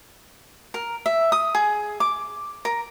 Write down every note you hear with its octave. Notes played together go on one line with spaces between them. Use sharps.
A#4
E5
D#6
G#4
D6
A#4